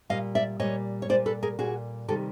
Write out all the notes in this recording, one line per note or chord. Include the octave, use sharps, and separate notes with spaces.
A#2 G3 D#5 F5
D5 E5
A#2 G3 C#5 D#5
C#5
A#2 G3 C5 D5
A4 B4
G#4 A#4
A#2 G3 F#4 G#4
C3 D#3 G3 G4 A4